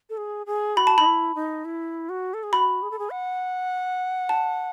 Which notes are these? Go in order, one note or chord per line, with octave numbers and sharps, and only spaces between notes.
A4
G#4
G#4
F#4 B5
A5
D#4 B5
E4
D#4
E4
F#4
A4
G#4
F#4 B5
G#4
A4
G#4
F#5
A5